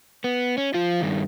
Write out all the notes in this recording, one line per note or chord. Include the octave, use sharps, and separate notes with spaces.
B3
C#4
F3 F4
G2 D#3